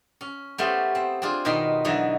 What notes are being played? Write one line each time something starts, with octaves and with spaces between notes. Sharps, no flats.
C#4
A3 B3 C#4 G4 A4 C5
C4
C4 D4 F4 G#4
B2 D#3 D#4 B4 D#5 C6
D3 E3 F#3 D#4 D#5